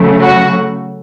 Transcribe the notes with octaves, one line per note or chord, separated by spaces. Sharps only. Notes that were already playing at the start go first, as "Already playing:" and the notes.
Already playing: C#3 F#3 A3
F#4